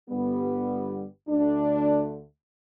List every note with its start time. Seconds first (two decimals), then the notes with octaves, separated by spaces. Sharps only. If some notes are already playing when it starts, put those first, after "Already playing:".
0.09 G1 G2 G3 B3
1.28 D2 D3 A3 D4